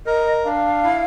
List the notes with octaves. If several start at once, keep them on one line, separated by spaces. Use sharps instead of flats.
A#4 D#5
D4 F5
E4